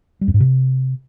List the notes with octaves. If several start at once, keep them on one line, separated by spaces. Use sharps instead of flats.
G3
F2
G#2
C3